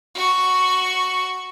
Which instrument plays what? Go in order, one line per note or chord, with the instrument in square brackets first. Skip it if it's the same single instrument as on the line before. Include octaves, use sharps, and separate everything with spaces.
[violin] F#4 C#6